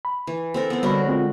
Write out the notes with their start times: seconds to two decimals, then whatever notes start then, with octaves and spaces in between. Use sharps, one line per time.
0.05 B5
0.27 E3
0.54 C4 A4 A#4
0.70 B3 C4
0.83 D3 G3 F#4 A#4 C#5 B5
1.07 G#3 C4 F4